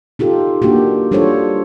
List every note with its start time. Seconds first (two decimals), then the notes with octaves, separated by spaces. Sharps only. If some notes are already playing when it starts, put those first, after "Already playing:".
0.19 D#4 F4 G4 A4
0.62 A#3 D4 F#4 G4
1.11 G3 D4 F4 A4 C5 C#5